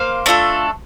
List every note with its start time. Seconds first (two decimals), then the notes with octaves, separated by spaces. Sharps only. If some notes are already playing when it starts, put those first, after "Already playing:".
Already playing: A#3 C5 F5
0.26 A3 D4 F4 A4